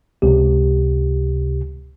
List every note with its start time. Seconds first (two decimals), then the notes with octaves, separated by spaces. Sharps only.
0.22 C#2 C3 G4